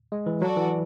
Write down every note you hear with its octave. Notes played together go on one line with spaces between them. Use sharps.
G#3
E3
F#3 F#4 A4 D5
E3